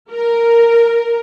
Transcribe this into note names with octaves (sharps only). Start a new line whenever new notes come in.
A#4